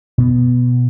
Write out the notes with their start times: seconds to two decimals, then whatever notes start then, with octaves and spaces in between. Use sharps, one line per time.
0.18 B2 B3